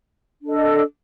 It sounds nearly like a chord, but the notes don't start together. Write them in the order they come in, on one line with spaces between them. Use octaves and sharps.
D4 A4 D#5